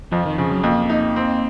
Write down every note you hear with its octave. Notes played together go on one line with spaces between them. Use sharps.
F2 F3
D#3
C#3 F3
F#3
F2 A#3
D#4
C4